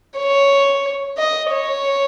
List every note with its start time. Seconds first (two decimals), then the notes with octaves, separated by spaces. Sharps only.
0.18 C#5
1.18 D#5
1.51 C#5